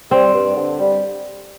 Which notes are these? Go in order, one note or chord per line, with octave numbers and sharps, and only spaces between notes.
G3 C4
G2
D3
G3